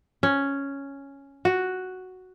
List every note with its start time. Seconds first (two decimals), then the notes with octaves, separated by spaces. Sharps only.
0.23 C#4
1.45 F#4